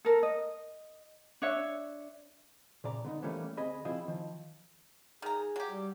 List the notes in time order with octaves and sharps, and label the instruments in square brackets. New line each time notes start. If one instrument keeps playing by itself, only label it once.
[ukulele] A4 A#4
D#5
D4 C#5 E5
[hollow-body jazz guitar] A#2 C#3 D5 A#5
D3 B3 D#4
E3 F3 G3 A3 A#3 C#4
D2 C4 G#4 D#5 G#5 B5
F3 C4 E4 F4 G#4 D#5
D#3 F3
[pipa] D#3 A#5 [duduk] G#4
[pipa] F#3 G4
[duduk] G3